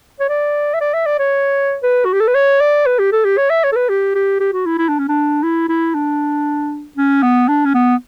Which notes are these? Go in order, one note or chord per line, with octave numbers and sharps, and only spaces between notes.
C#5
D5
E5
D5
E5
D5
C#5
B4
F#4
G4
A4
B4
C#5
D5
B4
G4
A4
G4
C#5
E5
C#5
A4
B4
G4
G4
G4
F#4
E4
E4
D4
C#4
D4
E4
E4
D4
C#4
B3
D4
C#4
B3